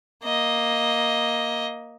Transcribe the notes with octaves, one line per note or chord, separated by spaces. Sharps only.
A#3 D#5